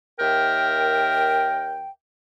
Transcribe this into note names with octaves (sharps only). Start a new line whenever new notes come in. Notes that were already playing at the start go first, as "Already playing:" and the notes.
D#2 A#4 E5 G5